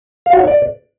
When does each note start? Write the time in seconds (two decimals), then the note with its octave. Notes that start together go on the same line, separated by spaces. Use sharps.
0.26 F5
0.33 F#4
0.40 C#5
0.48 D5